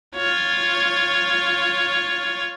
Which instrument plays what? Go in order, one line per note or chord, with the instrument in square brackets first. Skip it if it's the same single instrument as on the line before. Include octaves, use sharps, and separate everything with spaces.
[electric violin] F4 C#5